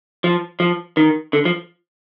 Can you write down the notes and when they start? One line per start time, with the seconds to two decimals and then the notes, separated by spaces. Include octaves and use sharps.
0.24 F3
0.60 F3
0.97 D#3
1.33 D3
1.45 F3